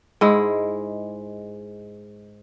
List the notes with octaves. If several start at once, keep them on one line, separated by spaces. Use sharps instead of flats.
G#2 G#3 E4